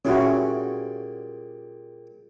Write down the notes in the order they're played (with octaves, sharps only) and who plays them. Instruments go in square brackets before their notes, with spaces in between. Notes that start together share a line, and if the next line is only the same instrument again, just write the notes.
[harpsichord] A#2 G3 G#4 [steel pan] C#4 E4 F#4